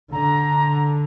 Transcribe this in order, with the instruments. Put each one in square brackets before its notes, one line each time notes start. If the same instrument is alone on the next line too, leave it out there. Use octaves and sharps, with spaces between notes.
[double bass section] D3 [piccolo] A#5